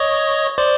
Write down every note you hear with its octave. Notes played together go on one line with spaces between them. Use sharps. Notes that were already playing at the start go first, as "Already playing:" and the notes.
Already playing: C#5 D#5
C5 D5